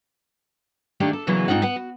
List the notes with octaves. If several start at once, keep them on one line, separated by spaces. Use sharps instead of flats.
D#3 A3 A#3 D4 D#4 G4
A4
E2 C#3 E3 F#3 A#3 B3
G#2 C4 D#4 F4 F#5
B3 F#5
F#4